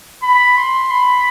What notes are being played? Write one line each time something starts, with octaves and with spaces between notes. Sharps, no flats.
B5
C6
B5